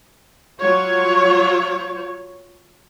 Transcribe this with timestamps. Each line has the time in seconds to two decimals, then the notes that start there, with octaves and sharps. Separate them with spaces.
0.60 F#3 F4 C#5